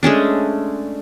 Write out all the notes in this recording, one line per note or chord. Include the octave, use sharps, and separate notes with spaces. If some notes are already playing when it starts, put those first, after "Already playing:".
G#3 A3 C#4 D4